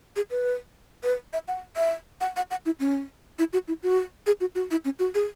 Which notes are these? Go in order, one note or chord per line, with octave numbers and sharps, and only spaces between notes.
G#4
B4
B4
E5
F#5
E5
F#5
F#5
F#5
E4
C#4
E4
F#4
E4
F#4
G#4
F#4
F#4
E4
C#4
F#4
G#4